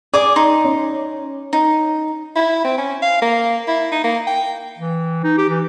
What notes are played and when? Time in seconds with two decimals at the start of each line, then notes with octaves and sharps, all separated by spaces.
0.14 G#4 D5 D6 D#6
0.36 D#4 C6
0.64 C#4
1.53 D#4
2.36 E4
2.64 C4
2.78 C#4
3.02 F5
3.22 A#3
3.68 E4
3.92 D#4
4.04 A#3
4.27 G5
4.79 E3
5.24 D#4
5.38 G4
5.50 E3